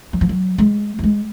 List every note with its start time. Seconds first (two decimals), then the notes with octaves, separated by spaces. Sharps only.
0.13 F#3
0.21 F3
0.29 F#3
0.58 G#3
0.99 F#3
1.04 G#3